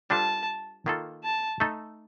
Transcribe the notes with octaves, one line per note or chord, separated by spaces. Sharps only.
G3 D4 F4 A4 C5 A5
D#3 A#3 F4 A4
A5
A3 D#4 A4